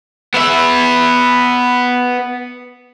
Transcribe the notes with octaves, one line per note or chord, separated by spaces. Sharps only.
B3 E5